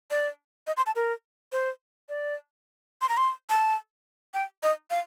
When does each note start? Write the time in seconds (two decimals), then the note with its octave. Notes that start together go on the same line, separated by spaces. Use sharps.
0.11 D5
0.67 D#5
0.77 C6
0.86 A5
0.96 A#4
1.52 C5
2.09 D5
3.02 C6
3.09 A#5
3.17 C6
3.50 A5
4.34 G5
4.63 D#5
4.90 F5